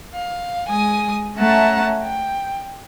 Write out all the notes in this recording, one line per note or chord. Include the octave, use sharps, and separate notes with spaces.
F5
G#3 G#5 D#6
A3 C#4 E5 F#5 A5 A#5
G5